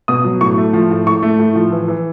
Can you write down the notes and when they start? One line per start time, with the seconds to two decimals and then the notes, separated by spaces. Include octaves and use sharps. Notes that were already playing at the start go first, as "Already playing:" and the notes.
0.08 B2 D#6
0.24 F#3
0.41 A2 C#6
0.58 A3
0.73 F3
0.91 A2
1.07 A2 C#6
1.23 A3
1.39 A2
1.55 F3
1.72 E3
1.88 E3